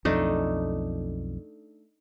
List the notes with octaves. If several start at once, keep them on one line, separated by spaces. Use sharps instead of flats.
B1 F2 A3 D4 D#4